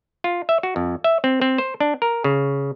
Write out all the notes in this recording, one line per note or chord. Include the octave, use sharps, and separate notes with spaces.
F4
E5
F#4
F2
E5
C4
C4
C5
D4
A#4
C#3